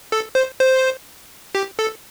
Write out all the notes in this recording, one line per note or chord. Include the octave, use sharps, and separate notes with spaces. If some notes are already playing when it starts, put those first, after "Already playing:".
A4
C5
C5
G4
A4